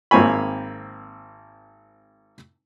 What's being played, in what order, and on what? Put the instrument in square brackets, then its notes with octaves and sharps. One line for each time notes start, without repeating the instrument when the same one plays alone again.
[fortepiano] G#1 A#3 C4 C#5 G#5 B5